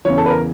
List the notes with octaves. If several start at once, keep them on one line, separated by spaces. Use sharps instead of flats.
E2 C#3 E3 C#5
A4
B4
A#4